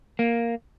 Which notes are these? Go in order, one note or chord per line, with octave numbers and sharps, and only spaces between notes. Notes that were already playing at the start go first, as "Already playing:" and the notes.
A#3